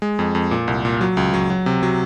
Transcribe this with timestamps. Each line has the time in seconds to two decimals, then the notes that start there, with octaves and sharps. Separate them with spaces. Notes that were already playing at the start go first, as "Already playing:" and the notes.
0.02 G#3
0.19 F2
0.35 F2
0.51 A#2
0.68 C2
0.85 A#2
1.01 F#3
1.17 C#2
1.34 F#3
1.50 F#3
1.66 C3
1.83 F#3